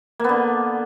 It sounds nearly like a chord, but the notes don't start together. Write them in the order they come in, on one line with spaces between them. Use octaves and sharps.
A#3 B3 D3